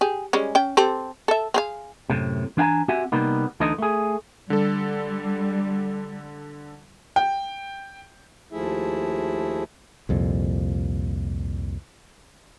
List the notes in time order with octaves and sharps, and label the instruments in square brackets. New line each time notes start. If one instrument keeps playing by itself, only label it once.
[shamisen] G4 G#4
G3 G#3 C#4
C#4 G5
C4 G4 A4
A4 E5
C4 G#4 F5
[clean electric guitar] F#2 A2 C3
E3 D4 F5 G#5 A#5
C4 F#4 G4 E5 F#5 G#5
C3 G3 A#3 B3 D#4
D2 D3 E3 D#4 D#5
A3 G#4
[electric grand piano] D3 A4 [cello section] G3
[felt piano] G5
[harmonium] D#2 F3 A3 E4 G#4 E5
[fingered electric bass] C2 F2 A#2